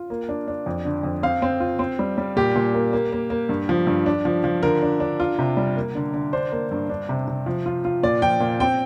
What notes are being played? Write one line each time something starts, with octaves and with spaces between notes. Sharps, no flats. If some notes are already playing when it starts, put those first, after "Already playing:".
Already playing: F4
A#3
D4
D4
F2
D3
F2
C4 F5
C4
F4
C4
G3
G3
A#2 G4
A#2
A#3
A#3
A#3
A#3
G2
F3
G2
D4
F3
F3
D3 A#4
D4
D4
F4
C3
G3
A#3
D3
D3
D4 C5
A#3
G2
D4
C3
C3
F3
F4
F4
A#2 D5
F3 G5
A#2
C4 G5